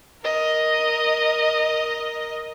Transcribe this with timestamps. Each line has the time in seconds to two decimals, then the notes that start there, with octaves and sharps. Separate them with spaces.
0.23 A#4 D#5